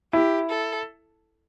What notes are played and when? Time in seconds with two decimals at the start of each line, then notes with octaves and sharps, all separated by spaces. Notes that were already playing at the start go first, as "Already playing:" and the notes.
0.13 E4 G4
0.50 A4